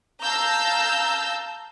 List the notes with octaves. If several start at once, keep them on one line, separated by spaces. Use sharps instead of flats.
F5 A5 A#5 E6 G6